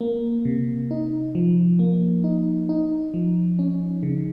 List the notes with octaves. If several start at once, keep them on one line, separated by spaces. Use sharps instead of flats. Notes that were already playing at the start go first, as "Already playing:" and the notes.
A#3
C3
D#4
F3
A#3
D#4
D#4
F3
C#4
C#3